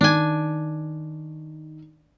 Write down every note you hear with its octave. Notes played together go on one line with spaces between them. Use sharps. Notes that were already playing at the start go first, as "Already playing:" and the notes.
D#3 D4 G#5